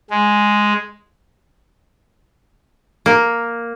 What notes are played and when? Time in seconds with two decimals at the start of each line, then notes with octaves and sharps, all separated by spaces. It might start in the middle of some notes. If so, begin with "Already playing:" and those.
0.10 G#3
3.06 A#3